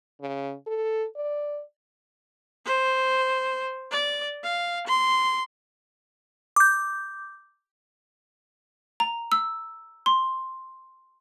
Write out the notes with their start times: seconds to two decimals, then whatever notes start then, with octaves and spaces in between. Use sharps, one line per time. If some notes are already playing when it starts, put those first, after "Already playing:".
0.20 C#3
0.67 A4
1.16 D5
2.66 C5
3.91 D5
4.44 F5
4.87 C6
6.56 D6 G6
9.00 A#5
9.32 E6
10.06 C6